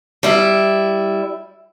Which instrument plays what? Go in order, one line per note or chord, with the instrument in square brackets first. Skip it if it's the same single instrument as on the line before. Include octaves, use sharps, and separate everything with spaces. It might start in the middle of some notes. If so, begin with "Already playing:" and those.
[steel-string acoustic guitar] G3 E4